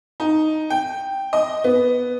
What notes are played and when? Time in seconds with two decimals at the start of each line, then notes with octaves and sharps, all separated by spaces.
0.20 D#4
0.70 G5
1.33 D#5
1.64 B3